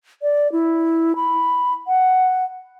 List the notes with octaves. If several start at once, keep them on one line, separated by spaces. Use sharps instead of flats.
D5
E4
B5
F#5